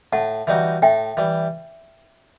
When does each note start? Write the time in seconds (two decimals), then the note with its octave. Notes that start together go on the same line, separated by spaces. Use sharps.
0.13 A2 F#5 A5
0.47 E3 G3 D#4 F#4
0.82 A2 E5 G5
1.17 E3 G3